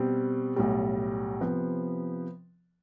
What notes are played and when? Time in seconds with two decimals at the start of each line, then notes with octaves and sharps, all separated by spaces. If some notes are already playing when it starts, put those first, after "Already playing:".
Already playing: B2 G3 C4
0.56 B1 A2 G3
1.41 C3 F3 B3